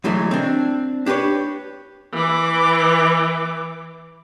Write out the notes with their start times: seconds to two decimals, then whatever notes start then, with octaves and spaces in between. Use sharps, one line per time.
0.04 D2 E3 F#3 G#3 A3
0.31 C4 D4
1.06 D4 G4 A#4 B4 C#5
2.13 E3 D6